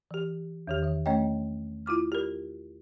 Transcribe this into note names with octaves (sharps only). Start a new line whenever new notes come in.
E3 G4
E2 D#3 G4
D#3 E5
A3 C#4 C#5 D#5 G5
E4 F4 D6 F6
G4 A#4